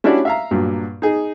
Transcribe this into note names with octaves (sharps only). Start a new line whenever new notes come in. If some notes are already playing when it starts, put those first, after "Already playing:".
C#4 D4 E4 F#4 G4 D5
E5 F5 A#5
G2 A#2 F#3
D#4 G#4